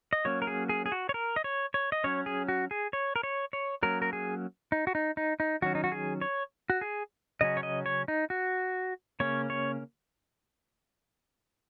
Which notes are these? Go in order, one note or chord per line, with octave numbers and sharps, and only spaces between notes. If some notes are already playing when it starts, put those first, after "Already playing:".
D#5
F#3 A#3 C#4 C#5
A#4
G#4
G#4
G#4
F#4
C#5
A#4
D#5
C#5
C#5
D#5
F#3 C#4 C#5
G#4
F#4
G#4
C#5
A#4
C#5
C#5
F#3 A#3 C#4 A#4
A#4
G#4
D#4
F#4
D#4
D#4
D#4
D#3 F#3 C#4 F#4
D#4
F#4
G#4
C#5
F#4
G#4
C#3 F#3 C#4 D#5
C#5
D#5
C#5
D#4
F#4
C#3 A#3 C#4 C#5
C#5